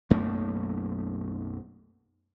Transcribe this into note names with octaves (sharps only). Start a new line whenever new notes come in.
B1 F#2 A3 A#3